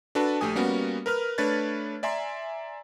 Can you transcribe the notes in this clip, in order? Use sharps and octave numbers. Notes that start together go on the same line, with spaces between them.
D4 F#4 A4 B4 A5
A#1 A3 G4 G#5 D#6
G3 A#3 B3 C#4 F#4
A#4 B4 F6
A3 D4 B4 C#5 G#6 A6
D5 E5 G#5 A#5 C6